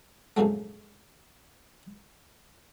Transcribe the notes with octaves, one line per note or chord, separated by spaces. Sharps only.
A#1 F2 G#2 C#3 F#3 A3